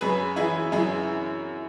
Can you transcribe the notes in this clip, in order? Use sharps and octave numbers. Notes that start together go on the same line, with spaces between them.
F#2 G#4 B4
E3 E4 G#4
F#2 E4 G#4